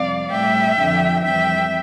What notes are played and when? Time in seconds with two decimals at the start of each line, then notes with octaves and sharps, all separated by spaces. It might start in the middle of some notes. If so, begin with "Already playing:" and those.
Already playing: F2 C3 G3 D5 F5
0.30 A2 G3 E5 G5
0.77 F2 D3 F3
1.24 F2 E3 G3 E5 G5